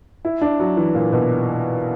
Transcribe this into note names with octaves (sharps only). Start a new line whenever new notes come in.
E4
D4
F#3
E3
A#2
B2